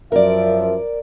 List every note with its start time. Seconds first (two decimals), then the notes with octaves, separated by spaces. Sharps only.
0.12 F#2 F3 A#4 D5 E5